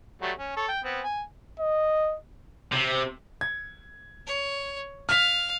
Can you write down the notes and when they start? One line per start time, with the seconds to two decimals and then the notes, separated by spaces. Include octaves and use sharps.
0.22 F#3 G3 A3
0.38 C#4
0.57 A4 C#5
0.69 G5
0.84 B3 C4
1.04 G#5
1.60 D#5
2.72 C3
3.41 G#6
4.27 C#5
5.09 F5 F6 B6